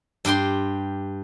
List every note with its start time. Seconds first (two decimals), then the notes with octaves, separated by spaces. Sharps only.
0.25 G2 G4 G5 C6